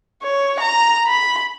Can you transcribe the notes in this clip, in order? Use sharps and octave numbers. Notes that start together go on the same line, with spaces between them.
C#5
A#5
B5